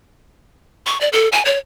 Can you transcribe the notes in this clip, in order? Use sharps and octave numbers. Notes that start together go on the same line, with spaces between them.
C#6
D5
A4
G#5
C#5